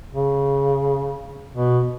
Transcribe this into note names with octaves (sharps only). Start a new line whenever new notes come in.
C#3
B2